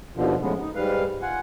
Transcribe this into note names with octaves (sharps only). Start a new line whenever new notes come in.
D#2 B2 D3 F3
A2 C#3 F3 G#3 B3
D#4
G#2 G3 B4 F5
F4 F#5 G#5